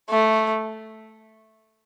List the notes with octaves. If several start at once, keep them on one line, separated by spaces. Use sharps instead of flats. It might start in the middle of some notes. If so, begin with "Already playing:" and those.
A3